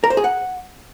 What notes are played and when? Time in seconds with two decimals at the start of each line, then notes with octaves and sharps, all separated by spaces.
0.04 A#4
0.10 C5
0.17 G#4
0.24 F#5